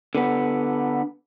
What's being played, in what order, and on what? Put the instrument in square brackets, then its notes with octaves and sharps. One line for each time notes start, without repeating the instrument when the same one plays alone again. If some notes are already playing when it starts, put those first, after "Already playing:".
[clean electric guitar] D3 B3